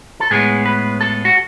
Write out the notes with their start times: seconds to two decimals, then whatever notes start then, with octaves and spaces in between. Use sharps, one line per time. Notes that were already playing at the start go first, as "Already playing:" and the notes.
0.20 A4
0.31 A2 G#3 B3 G#4
0.66 B4
1.01 A4
1.25 F#4